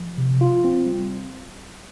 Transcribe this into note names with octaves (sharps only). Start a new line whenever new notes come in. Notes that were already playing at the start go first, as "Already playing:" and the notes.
Already playing: F3
C3
F4
C4
G3